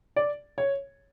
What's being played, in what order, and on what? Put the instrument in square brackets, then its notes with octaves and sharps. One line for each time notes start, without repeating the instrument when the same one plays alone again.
[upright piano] D5
C#5